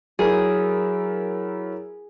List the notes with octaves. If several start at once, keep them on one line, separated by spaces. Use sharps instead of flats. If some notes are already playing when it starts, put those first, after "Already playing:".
F#3 E4 G#4 A#4